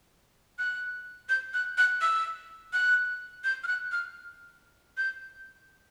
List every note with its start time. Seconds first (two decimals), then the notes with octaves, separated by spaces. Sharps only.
0.59 F#6
1.29 G6
1.54 F#6
1.78 F#6
2.01 E6
2.73 F#6
3.44 G6
3.64 F6
3.67 F#6
3.92 F6
4.97 G6